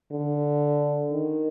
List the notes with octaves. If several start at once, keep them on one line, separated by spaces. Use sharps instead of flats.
D3
D#3